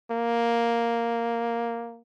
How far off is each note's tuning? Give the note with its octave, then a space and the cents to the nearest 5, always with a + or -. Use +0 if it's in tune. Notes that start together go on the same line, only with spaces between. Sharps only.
A#3 +0